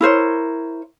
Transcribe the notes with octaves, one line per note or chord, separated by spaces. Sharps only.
E4 A#4 C5 C#5